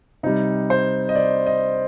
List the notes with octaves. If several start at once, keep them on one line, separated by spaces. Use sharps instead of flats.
C3 G3 D#4
C5
D#5
D5
D#5